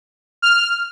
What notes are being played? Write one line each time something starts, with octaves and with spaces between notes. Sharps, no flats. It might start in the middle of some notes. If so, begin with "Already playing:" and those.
F6